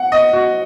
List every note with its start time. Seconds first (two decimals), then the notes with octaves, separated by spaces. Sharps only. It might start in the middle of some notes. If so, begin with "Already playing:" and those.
Already playing: F#5
0.12 D#5
0.33 F#4